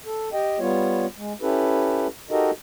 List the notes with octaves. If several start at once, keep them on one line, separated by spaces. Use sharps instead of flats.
A4
G4 D#5 G5
G3 B3 F4 C#5
G#3
C#4 E4 G4 A4 B4
D#4 F#4 G4 A4 A#4 D#5